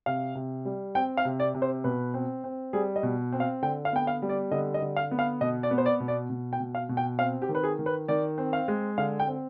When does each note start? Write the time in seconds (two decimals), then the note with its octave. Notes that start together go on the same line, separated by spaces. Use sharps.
0.06 C3 F5
0.35 C3
0.65 G3
0.95 C4 G5
1.17 F5
1.25 C3
1.40 D5
1.55 C3
1.62 C5
1.84 B2 B4
2.14 C4
2.44 C4
2.73 G3 G#4
2.96 D#5
3.03 B2
3.32 C4
3.40 F5
3.62 D3 G5
3.85 F5
3.93 B3 G5
4.07 F5
4.22 G3
4.29 D5
4.51 D3 D#5
4.74 D#5
4.81 D3
4.96 F5
5.11 B3
5.19 F5
5.41 B2 D#5
5.63 D5
5.71 B3
5.78 C5
5.86 D5
6.00 B2
6.08 D5
6.30 B2
6.53 G5
6.60 B2
6.75 F5
6.89 B2
6.97 G5
7.19 C4 F5
7.42 G4
7.49 D#3
7.55 B4
7.64 G#4
7.79 D#3
7.86 B4
8.08 D#3 D5
8.38 C4
8.53 F5
8.68 G#3
8.98 D3 F5
9.20 G5
9.27 C4